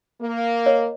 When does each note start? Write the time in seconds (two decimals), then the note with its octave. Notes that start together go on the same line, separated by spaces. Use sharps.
0.22 A#3
0.66 C#5 D#5